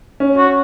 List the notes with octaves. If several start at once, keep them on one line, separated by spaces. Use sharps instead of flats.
C#4
F#4